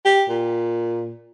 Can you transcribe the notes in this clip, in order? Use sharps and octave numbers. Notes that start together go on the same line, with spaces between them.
G4
A#2